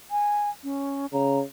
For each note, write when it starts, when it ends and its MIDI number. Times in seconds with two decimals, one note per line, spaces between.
0.11 0.49 80
0.64 1.06 61
1.13 1.43 49
1.13 1.39 82